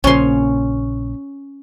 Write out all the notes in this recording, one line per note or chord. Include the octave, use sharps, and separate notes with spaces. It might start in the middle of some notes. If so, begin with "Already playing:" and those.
A#1 A#2 C#3 C#4 C6